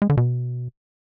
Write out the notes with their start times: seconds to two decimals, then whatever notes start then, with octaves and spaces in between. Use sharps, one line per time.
0.02 G#3
0.10 D3
0.17 B2